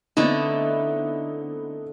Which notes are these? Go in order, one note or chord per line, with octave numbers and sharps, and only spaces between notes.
D3 A3 B3 C4 D#4 E4